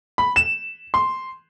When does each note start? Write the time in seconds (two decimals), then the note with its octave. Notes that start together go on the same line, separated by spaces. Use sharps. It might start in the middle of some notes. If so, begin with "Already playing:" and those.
0.18 B5
0.36 E7
0.94 C6